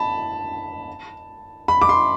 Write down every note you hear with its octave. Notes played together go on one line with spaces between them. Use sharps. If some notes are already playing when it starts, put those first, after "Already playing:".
Already playing: A5 B5
B5
D6
C6